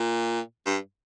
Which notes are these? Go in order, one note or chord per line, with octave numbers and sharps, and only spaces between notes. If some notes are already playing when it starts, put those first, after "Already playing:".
Already playing: A#2
G2